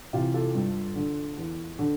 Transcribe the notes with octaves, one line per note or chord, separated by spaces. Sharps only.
C3 E3 F4
F4 A4
G2
D3
E2
D3